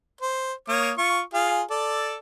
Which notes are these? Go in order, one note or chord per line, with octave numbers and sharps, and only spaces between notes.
C5
A#3 C#5 D#6
F4 C#6
F4 G#4 F5
A4 D5